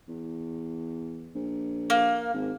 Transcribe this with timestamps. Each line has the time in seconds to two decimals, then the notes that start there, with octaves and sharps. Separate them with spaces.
0.08 E2
1.35 A#1
1.90 A#3
2.33 G#1